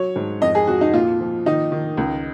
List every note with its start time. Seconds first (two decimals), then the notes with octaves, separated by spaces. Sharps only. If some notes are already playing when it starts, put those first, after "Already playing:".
Already playing: F#3 C#5
0.16 G#2
0.42 F2 D#5
0.55 G#4
0.67 F2 F#4
0.81 D#4
0.94 A#2 F4
1.21 F3
1.46 D#3 D#4
1.72 D#3
1.97 C#2